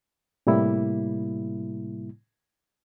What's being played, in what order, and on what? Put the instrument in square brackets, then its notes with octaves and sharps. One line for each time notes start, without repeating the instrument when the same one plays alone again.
[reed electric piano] A2 C3 G3 A#3 E4